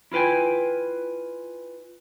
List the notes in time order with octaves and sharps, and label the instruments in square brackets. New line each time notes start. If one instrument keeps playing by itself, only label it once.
[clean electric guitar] E4 F4 B4 G5 G#5